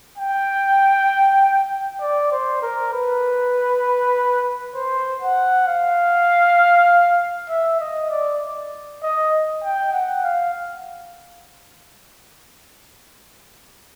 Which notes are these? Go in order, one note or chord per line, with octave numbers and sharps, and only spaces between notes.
G5
D5
C5
A#4
B4
C5
F#5
F5
E5
D#5
D5
D#5
G5
F#5
F5